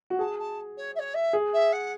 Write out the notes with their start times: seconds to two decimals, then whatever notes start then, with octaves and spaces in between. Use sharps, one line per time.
0.10 F#4
0.19 G#4 A5
0.39 A5
0.77 C#5
0.95 E5
0.99 C#5
1.14 E5
1.33 G#4
1.53 E5
1.72 F#5